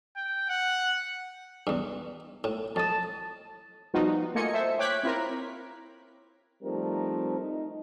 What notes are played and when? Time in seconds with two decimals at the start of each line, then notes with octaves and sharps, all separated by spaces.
0.16 G5
0.49 F#5
1.67 E2 G2
2.44 A2
2.76 F2 A5 D#6
3.94 F3 G3 B3 D#4 F4 F#4
4.35 A3 A#3 F4 D#5 G#5 C#7
4.53 A4 C5 E5
4.79 C#5 G5 D6 F#6 G#6 B6
5.03 C4 E4 F4 A#4
6.63 F3 G3 A3 C4 D#4 A#4
7.41 D#4